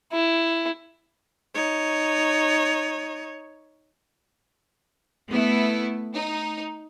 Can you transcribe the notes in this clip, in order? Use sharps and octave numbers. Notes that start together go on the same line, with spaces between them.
E4
D#4 C#5
A3 B3 E4
D#4